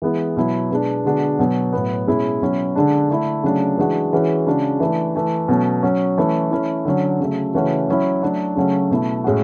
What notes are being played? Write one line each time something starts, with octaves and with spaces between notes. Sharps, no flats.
E3 G#3 B3 E4
B2 F#3 B3 E4
B2 G#3 D4
D3 G#3 B3 D4 F#4
B2 F#3 B3 F#4
A2 F#3 B3
B2 G#3 C#4 E4
B2 F#3 C#4 E4
D3 G#3 D4
D3 A3 E4
C#3 F#3 A3 D4
E3 G#3 D4 F#4
E3 G#3 C#4 F#4
C#3 G#3 D4 F#4
E3 A3 D4
E3 A3 E4
B2 F#3 A3 C#4
F#3 C#4 F#4
E3 A3 C#4 E4
E3 A3 C#4 E4
D3 F#3 C#4
C#3 F#3 A3
C#3 E3 A3 C#4 F#4
F#3 C#4 E4
F#3 A3 D4 F#4
C#3 F#3 A3 C#4 F#4
B2 A3 E4
A2 G#3 C#4 F#4